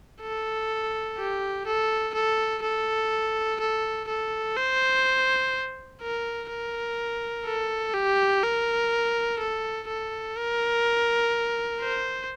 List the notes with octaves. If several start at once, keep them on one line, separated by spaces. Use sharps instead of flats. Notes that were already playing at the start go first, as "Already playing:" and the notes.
A4
G4
A4
A4
A4
A4
A4
C5
A#4
A#4
A4
G4
A#4
A4
A4
A#4
C5